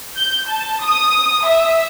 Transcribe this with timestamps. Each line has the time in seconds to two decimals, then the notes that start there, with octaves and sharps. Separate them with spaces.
0.17 G6
0.47 A5
0.83 D#6
1.46 E5